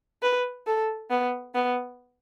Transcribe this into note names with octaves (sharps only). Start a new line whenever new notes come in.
B4
A4
B3
B3